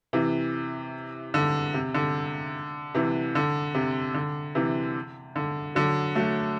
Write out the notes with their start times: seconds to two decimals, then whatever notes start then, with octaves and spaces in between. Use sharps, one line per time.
0.13 C3 E3
1.34 D3
1.74 C3
1.94 D3
2.94 C3 E3
3.35 D3
3.75 C3
4.14 D3
4.55 C3 E3
5.36 D3
5.75 D3 F#3
6.15 F#3 A3